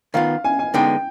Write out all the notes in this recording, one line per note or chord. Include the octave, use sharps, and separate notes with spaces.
D#3 B3 F4 F5
G#5
G#5
D3 G#3 B3 D#4 G5